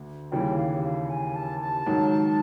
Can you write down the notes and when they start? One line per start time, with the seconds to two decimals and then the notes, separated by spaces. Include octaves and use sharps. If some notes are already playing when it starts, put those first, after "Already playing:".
Already playing: D2 D3
0.32 D#2 C#3 E3 G3 G5
0.58 F5
0.84 F5
1.10 G#5
1.35 A5
1.61 A5
1.86 G#2 D#3 F#3